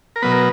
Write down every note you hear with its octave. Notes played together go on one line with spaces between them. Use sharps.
A#4
B2 F#3 B3 B4
A#4